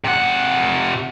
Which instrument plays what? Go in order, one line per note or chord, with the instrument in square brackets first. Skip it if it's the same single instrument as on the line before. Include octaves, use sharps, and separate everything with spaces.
[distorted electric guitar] C3 F#5